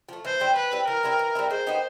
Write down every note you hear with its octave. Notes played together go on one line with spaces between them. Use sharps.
F3 A3
E3 C5
G3 C4 E4
E3 B4
G3 C4 E4
E3 A#4
G3 C4 E4
E3
G3 C4 E4
G#3 C5
B3 D#4 G4